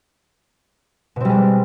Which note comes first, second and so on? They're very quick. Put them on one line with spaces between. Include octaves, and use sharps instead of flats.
B2 C4 G3 G#3